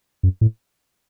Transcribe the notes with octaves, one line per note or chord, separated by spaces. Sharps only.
F#2
A2